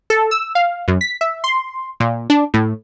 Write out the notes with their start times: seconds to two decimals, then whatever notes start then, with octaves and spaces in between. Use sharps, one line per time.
0.10 A4
0.31 E6
0.55 F5
0.88 F#2
1.01 B6
1.21 E5
1.44 C6
2.00 A#2
2.30 D4
2.54 A2